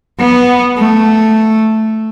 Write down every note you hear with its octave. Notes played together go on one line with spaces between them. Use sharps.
B3
A3